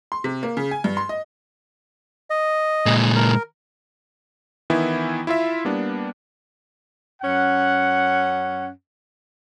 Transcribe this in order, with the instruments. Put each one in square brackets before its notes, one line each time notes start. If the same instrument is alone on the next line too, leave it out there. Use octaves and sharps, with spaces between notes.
[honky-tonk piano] C6
C3
A#3
C#3
G#5
G2
C6
D#5
[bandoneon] D#5
[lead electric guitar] A#2 G#3
[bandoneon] A#4
[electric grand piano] D#3 E3 B3 E4
E4 F4 E5
G3 A#3 B3 D4
[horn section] F#2 C#4 F#5